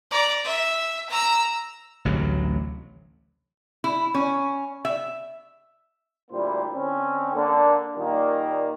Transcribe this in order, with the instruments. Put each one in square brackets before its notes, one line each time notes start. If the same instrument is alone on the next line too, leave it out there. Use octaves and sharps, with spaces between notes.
[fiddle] D5 A#5
E5
A#5 E6
[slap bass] A1 D2 C3 F#3
[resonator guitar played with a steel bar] E4
C#4
E5
[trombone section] D2 A#2 G3 A#3 E4 C5
D3 C4 C#4
D3 A#3
A#2 D#3 G3 A#3